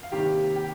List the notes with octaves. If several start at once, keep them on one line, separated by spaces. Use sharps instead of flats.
F5
C3 D#3 G3 A#3 G4 G5
G4 G5